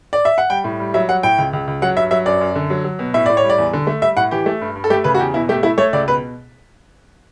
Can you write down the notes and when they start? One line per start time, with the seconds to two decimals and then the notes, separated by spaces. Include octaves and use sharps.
0.13 D5
0.25 E5
0.38 F#5
0.50 G3 G5
0.64 A2
0.80 G3
0.94 F#3 E5
1.09 F#3 F#5
1.23 A2 G5
1.38 C#2
1.53 C#2
1.68 C#2
1.82 F#3 F#5
1.97 G2 E5
2.11 F#3 E5
2.26 F#2 D5
2.41 F#2
2.55 D3
2.70 F#3
2.84 F#3
2.99 B2
3.14 A2 E5
3.26 A2 D5
3.37 C#5
3.43 G3
3.50 D5
3.58 E2
3.73 D3
3.87 A3
4.02 G3 E5
4.17 A2 F#5
4.31 E3 G4
4.46 A3
4.61 G2
4.76 G2
4.84 A4
4.90 A3 G4
5.04 C#3 B4
5.14 F#4
5.19 E2 G4
5.34 B2 E4
5.49 A3 G4
5.63 A3 E4
5.78 A3 C#5
5.93 C#2 D5
6.08 B2 B4